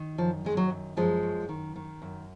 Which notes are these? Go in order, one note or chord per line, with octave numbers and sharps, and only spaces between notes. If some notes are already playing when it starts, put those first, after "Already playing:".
Already playing: D#3
F#2 F3
D#3 G#3
F#3
F#2
F#2 F3 G#3
F#2
D#3
D#3
F#2